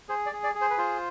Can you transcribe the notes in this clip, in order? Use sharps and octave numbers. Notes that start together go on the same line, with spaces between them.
G#4 C5
D5
G#4
D5
G#4
C5
B4
F4 C5